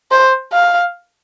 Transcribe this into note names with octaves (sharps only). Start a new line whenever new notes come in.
C5
F5